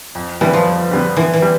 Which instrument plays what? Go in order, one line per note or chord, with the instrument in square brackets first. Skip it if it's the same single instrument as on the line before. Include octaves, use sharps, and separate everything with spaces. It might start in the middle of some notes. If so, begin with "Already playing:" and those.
[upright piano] F2
[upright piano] D3 G3 B3 [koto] E3
[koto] F3
[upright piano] F2
D3 G3 B3
[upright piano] D3 [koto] E3
[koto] E3
[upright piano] G3